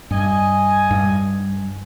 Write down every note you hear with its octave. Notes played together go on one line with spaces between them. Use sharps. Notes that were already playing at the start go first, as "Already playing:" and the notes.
G2 D#5 G#5
G2